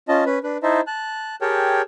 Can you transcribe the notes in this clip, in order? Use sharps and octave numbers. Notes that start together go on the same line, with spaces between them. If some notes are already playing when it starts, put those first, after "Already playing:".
C#4 F4 D#5 A5
C#4 B4 B5
D4 B4
D#4 E4 C5 D#5 E5 A5
A5 F#6
G4 G#4 A#4 C#5 G5 A5